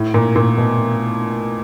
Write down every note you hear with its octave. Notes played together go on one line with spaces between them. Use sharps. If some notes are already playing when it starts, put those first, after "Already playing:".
Already playing: A2
A#2
A#2
B2